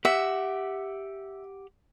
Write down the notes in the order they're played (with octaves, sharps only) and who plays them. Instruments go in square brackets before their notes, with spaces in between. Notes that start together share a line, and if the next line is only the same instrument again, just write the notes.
[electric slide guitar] G4 F#5 [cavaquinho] E5